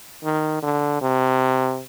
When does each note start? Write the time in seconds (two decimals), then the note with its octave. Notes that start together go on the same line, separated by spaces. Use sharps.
0.24 D#3
0.62 D3
1.01 C3